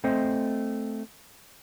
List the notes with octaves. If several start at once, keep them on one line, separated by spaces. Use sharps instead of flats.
A3 C4 C5 D#5